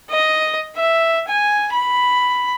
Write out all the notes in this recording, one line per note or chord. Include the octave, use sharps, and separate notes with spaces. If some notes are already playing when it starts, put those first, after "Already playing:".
D#5
E5
G#5
B5